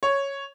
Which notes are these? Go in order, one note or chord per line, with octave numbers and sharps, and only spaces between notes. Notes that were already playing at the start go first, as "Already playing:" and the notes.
C#5